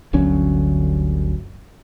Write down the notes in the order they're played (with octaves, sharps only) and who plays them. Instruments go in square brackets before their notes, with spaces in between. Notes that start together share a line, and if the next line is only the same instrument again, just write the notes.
[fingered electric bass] G1 D2 F#3 C#4